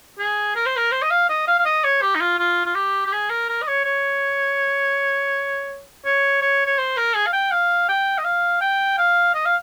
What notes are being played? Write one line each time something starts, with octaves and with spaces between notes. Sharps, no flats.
G#4
A#4
C5
A#4
C5
D#5
F5
D#5
F5
F5
D#5
C#5
G4
D#4
F4
F4
F4
G4
G4
G#4
A#4
A#4
D#5
C#5
C#5
C#5
C#5
C#5
C5
A#4
G#4
F5
G5
F5
G5
D#5
F5
G5
F5
D#5
F5